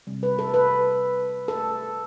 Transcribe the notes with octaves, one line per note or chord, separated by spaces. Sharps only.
C3 G3
B4
A4
B4
A4